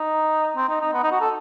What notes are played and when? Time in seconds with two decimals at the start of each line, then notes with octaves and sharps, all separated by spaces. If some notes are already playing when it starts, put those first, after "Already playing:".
Already playing: D#4
0.56 C4
0.69 D#4
0.81 D#4
0.94 B3
1.03 D#4
1.12 F#4
1.21 A4